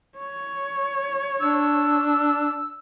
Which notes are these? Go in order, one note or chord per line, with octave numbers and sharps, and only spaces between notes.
C#5
D4 E6